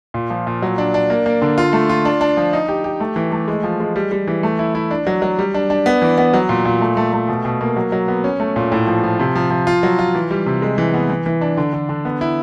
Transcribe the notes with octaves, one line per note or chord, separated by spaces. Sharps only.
A#2
F3
A#2
F#3
D4
D4
A#3
A#3
D3
F4
A3
F4
D4
D4
F3
D#4
G4
G4
A3
E3
A3
G#3
F3
G#3
G3
G3
E3
A3
E4
E4
D4
F#3
F#3
G3
D4
D4
B3
E3
B3
F#3
A#2
A#2
A3
A3
A3
B2
B2
A#3
F#3
F#3
B3
C#4
A3
A#2
A2
F3
F3
C3
F3
F3
F4
F#3
F4
E3
G3
C3
G#3
E3
B3
E3
E3
D4
D3
D3
D3
B3
E4